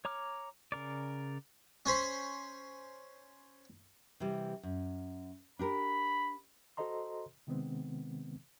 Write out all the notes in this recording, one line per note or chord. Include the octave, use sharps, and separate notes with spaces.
C#5 A#5 D6 F6
C#3 A#4 D5
C#4 C5 B5
C3 E3 G3
F#2
D4 G4 A#4 B5
F#4 A4 C5 D#5 A#5 C6
C3 D#3 G#3 B3 C4